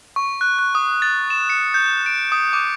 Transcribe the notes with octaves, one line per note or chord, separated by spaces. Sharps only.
C#6
F#6
F#6
D#6
A6
E7
C#7
G6
D7
D#6
D6